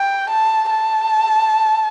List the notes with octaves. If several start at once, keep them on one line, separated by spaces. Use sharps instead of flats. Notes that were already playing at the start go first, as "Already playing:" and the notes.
Already playing: G5
A5
A5